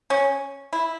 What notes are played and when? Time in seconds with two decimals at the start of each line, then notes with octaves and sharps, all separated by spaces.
0.10 C#4
0.73 E4